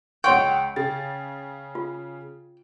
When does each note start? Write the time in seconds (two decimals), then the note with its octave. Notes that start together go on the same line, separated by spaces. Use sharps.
0.24 C#2 C#5 F#5 G5 C6 C#6
0.76 C#3 A6
1.75 F4